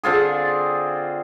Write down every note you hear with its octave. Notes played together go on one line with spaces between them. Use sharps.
D3 C4 F4 G#4